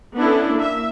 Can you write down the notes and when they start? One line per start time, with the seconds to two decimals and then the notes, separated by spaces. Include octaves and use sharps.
0.17 B3 C#4 D4 E4 A4
0.55 A#3 E5